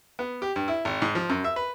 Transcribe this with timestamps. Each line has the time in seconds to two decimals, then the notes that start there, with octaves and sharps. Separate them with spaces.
0.19 B3
0.42 G4
0.56 G2
0.68 E4
0.85 G#1
1.02 G#2
1.15 F3
1.30 F#2
1.44 E5
1.56 B4